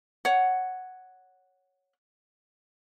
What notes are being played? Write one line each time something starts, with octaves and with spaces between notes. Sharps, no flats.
C#5 F#5